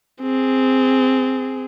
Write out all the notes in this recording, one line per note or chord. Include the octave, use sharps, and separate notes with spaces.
C4 G#4